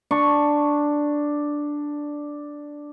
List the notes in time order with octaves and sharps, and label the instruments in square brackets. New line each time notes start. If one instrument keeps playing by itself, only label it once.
[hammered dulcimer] D4 C#6